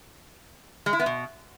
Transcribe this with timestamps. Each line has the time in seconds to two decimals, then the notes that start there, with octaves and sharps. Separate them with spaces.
0.86 G#3
0.93 E4
0.99 B3
1.06 B2